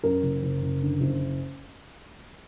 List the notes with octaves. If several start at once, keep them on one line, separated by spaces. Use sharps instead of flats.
F#2 A#4
F#1
F#1
F#1
D3
F#1